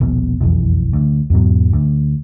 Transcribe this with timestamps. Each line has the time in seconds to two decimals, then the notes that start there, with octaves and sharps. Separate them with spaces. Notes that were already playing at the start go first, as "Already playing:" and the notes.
0.01 D#1 A#1 B2
0.41 E1 B1 F2 E3
0.93 D2
1.30 E2 G#2 B2 F#3
1.73 D2